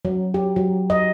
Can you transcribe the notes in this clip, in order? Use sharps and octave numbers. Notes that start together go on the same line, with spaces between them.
F#3
G4
F#3
D#5